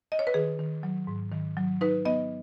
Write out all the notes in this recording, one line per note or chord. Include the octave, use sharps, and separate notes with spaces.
D#5
C#5
B4
D#3 G#4
D#3
F#3
G#2
D#3
F#3
D#4 B4
B3 D#5